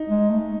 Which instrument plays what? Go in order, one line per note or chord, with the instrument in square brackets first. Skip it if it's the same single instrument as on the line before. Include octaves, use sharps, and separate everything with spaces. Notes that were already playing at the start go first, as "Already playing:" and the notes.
Already playing: [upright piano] D#4
[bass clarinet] G#3
A3